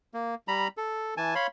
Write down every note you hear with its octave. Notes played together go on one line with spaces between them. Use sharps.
A#3
G3 A#5 B5
A4
E3 G#5 A5
C#5 F5 B5 C6